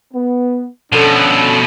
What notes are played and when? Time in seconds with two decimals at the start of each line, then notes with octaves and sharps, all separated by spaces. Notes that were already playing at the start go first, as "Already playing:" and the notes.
0.13 B3
0.92 B2 F3 C#4 D4 A4